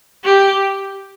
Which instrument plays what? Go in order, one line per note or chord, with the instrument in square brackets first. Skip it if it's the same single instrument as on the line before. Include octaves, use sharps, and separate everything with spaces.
[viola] G4